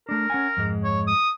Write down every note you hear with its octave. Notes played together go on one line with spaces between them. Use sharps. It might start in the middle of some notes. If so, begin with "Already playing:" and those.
A3 D4 A#4
C#4 F#5 G#5
F2 G#2 G#3
C#5
D#6